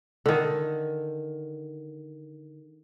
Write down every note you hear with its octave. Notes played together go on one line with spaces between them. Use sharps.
D3 D#3